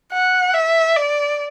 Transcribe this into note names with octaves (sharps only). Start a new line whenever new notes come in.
F#5
E5
D5